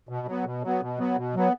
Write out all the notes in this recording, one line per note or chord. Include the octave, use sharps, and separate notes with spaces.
B2
F#3 B3
B2
F#3 B3
B2
F#3 B3
B2
F#3 B3